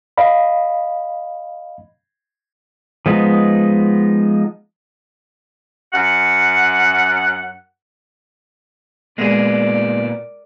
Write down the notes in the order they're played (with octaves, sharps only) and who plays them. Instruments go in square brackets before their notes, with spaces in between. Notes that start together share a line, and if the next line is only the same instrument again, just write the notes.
[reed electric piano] D#5 F5 B5
[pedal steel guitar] F3 G#3 B3 D#4
[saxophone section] F#2 F#5
[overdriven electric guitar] A#2 B3 [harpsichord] G#3 G#4 [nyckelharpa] A#4 D5